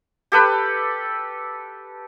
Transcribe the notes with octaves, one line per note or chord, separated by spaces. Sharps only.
G4 A4 B4